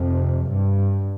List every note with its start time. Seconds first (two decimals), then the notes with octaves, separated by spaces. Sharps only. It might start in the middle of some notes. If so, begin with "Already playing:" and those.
Already playing: F2 C3
0.48 G2